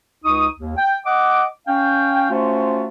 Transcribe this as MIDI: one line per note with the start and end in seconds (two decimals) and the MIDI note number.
0.23 0.47 37
0.23 0.47 63
0.23 0.47 85
0.23 0.47 87
0.58 0.73 39
0.76 0.95 79
1.05 1.43 75
1.05 1.43 78
1.05 1.43 86
1.67 2.29 61
1.67 2.29 77
1.67 2.29 79
2.30 2.88 57
2.30 2.88 61
2.30 2.88 65
2.30 2.88 66
2.30 2.88 72